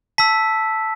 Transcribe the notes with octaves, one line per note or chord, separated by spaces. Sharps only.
A5 E6 B6